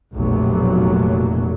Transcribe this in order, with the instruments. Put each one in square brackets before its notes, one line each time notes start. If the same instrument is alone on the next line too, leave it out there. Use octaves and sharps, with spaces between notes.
[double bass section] F1 B1 A#2 F#3